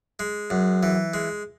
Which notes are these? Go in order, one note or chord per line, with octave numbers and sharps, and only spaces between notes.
G#3
F#2
E3
G#3